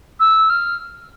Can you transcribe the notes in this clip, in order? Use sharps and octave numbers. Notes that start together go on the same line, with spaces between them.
E6
F6